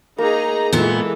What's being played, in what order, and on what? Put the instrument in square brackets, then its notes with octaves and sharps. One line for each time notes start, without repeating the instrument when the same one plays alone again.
[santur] A#3 [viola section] D#4 G#4 A#5
[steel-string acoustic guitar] A#2 B3 [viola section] E3 G#3 A4